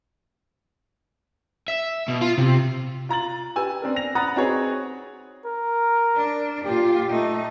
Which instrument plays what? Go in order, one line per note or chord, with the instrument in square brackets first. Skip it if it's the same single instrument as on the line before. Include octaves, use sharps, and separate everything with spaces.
[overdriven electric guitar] E5
B2
F4
C3
[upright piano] F4 A#5 A6 F#7
G4 B4 G#5 E6
B3 C4 D4 A#4
A#6 F7
F#5 A#5 B5 D#6 F#6 A6
C4 D#4 F#4 G#4 B4 C#5
[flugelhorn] A#4
[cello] D4
[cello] A#2 F4 [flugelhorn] G4
[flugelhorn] A3 [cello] D#4